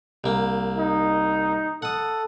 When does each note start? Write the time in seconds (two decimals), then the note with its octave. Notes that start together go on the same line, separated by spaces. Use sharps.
0.24 C2 A#3
0.78 D#4
1.82 A4 F#5 D#6